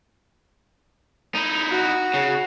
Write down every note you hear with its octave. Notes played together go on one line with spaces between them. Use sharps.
D#4 E4
F#4
C#3